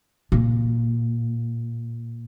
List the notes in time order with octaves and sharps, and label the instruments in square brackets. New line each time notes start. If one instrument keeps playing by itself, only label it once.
[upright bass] A#2